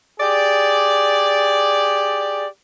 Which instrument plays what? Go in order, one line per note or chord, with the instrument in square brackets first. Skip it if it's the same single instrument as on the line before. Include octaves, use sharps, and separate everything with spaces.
[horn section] G4 G#4 D5